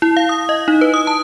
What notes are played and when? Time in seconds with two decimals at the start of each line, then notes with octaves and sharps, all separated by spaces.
0.02 E4
0.17 F5
0.29 D#6
0.49 D#5
0.68 D#4
0.81 B4
0.94 D#6
1.07 A5